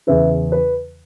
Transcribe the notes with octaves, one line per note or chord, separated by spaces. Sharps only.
E2 C#3 E3 B4 E5
B4